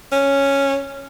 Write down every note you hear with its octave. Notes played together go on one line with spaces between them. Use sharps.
C#4